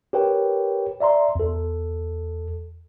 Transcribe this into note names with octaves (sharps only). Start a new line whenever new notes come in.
G4 A#4 B4 C#5 G5
D5 E5 A#5 C6
E2 A4